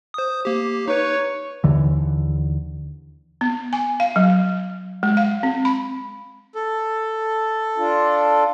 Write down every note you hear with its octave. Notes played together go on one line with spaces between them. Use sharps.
C5 D#6
A#3 G4
D#4 B4 C#5
D#2 D3 E3
B3
G#5
F5
F#3
G#3
F5
C4
B5
A4
D4 F4